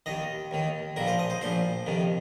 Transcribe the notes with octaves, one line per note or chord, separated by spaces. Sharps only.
D#2 D#3 D#5
D#2 D#3
A#1 A#2 F3 A#4
C5
D#5
C5
A#1 A#2 F3 C5
F2 C3 D#3